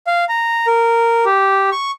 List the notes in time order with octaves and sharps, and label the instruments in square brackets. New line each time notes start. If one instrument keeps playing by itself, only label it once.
[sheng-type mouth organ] F5
A#5
A#4
G4
C#6